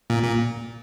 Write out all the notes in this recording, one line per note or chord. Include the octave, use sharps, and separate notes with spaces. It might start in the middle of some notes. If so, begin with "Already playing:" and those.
A#2
A#2